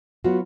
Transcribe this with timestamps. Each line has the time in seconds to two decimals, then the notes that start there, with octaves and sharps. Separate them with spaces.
0.24 F#3 B3 F4 F#4